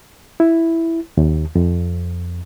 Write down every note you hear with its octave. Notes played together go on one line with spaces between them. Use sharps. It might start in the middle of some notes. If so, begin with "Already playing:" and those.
E4
D#2
F2